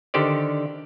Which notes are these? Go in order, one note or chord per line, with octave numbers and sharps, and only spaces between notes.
D3 D#3 G4 C5 D5